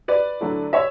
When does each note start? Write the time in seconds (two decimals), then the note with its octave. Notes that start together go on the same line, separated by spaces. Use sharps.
0.08 B4 D5
0.41 D3 F#3 A3 E4
0.73 C#5 E5